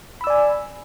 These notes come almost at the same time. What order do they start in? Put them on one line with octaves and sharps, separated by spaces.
B5 E6 D5 G#5